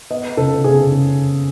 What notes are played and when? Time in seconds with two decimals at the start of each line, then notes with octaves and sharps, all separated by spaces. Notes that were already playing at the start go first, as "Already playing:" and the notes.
0.10 B3 D#5
0.37 C#3 A4
0.64 C#3 G#4
0.91 C#3